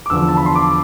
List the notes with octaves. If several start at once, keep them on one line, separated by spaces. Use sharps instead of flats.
D6
E2 D3 F3 E6
A5
B5
C6
D6